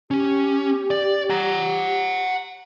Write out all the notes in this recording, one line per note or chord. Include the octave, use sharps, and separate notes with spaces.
C#4 G4
D5
F#5 A#5